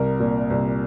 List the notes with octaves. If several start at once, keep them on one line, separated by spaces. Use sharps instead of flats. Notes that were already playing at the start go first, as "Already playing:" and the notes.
Already playing: C2 A#4
A#2
C2